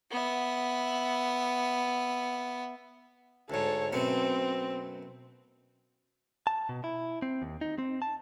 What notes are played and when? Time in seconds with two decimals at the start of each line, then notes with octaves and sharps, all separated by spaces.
0.11 B3 E5
3.50 D2 G#2 A4 C#5
3.93 F#2 B2 A3 C4
6.47 A5
6.69 B2
6.84 E4
7.22 C4
7.42 D#2
7.61 D#4
7.78 C4
8.02 A5